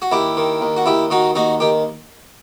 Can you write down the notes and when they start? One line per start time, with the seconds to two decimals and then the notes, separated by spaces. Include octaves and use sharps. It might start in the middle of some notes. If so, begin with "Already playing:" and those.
0.02 F#4
0.12 D#2 E4 G4
0.37 D#3
0.61 D#2
0.77 F#4
0.86 D#2 E4 G4
1.10 D#3 D#4 F#4
1.35 D#2 D#4 F#4
1.60 D#3 G4